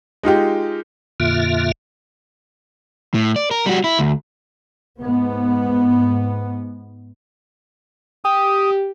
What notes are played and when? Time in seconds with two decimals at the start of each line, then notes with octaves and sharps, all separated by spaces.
0.23 G#3 D#4 F4 G4
1.20 F2 A#2 D3 A#3 F4 E5
3.14 A2
3.36 D5
3.51 A#4
3.66 G3 F#4
3.84 E4
3.99 D2
5.00 G#2 B3
8.25 G4 D#6